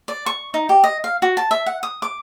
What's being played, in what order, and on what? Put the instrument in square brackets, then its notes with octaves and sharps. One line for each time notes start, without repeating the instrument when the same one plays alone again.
[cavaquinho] D5
C#6
D#4
G4
D#5
F5
F#4
A5
E5
F#5
D#6
D6